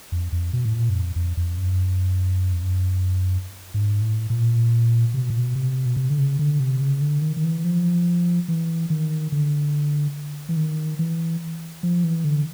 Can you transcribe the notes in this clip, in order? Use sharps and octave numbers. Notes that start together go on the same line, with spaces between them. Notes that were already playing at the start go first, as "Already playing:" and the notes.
F2
F2
B2
A2
A#2
F#2
F2
F2
F2
F#2
F2
F#2
G#2
A2
A#2
C3
B2
A#2
B2
C3
B2
C3
D3
C#3
D3
C3
C#3
D3
D#3
D#3
E3
F3
E3
D#3
D3
E3
D#3
E3
F3
E3
D3